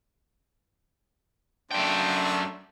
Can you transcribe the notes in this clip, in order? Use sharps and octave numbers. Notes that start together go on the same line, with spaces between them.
F#2 A3 D4 G5 C6